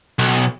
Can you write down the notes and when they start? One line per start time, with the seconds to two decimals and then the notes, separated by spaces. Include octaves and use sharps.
0.19 B1